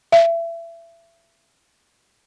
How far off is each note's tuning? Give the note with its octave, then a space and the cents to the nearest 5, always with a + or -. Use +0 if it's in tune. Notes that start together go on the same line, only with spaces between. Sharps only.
E5 +30